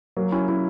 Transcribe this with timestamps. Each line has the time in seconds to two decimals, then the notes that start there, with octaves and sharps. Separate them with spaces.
0.17 F#3 A#3
0.32 C#4 E4
0.48 C#4 E4